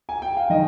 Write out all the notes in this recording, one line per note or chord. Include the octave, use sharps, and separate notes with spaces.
G#5
G5
F5
D#3 D#5